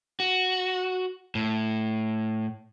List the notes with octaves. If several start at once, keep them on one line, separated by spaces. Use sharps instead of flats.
F#4
A2